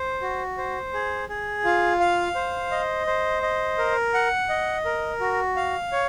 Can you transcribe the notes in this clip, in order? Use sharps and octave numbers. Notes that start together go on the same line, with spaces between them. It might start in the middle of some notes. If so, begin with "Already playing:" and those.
Already playing: C5
F#4
C5
G#4
G#4
F4
F5
C5
D#5
C5
D#5
A#4
F#5
D#5
A#4
F#4
F5
C#5